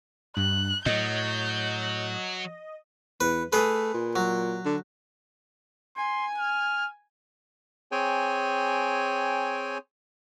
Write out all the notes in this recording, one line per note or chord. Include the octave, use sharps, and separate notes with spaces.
G2 F#6
A2 F#3 D#5 G6
E2 B4
A3 G#4 B4
A#2
F#3
D3
G#5 C6
F6
C4 G#4 C#5 G5 G#5